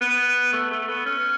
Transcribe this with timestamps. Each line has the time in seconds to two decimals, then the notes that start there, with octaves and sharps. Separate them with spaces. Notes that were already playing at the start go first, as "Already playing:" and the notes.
0.01 B3
0.53 A3
0.71 A3
0.89 B3
1.06 C#4